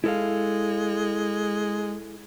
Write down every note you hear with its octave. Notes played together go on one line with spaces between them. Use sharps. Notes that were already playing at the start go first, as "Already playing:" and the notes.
G#3 E4 A4 F5